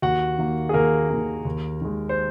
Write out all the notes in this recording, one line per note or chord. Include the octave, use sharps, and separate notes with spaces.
D#2 F#4 F#5
D#3 A#3
G#4
D#2 A#3 A#4
D#3 A#3
D#2
D#3 G#3
C5